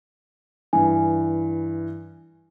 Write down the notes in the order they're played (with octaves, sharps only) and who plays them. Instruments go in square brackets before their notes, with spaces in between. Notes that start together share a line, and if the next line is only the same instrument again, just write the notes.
[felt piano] G2 E3 [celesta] G#5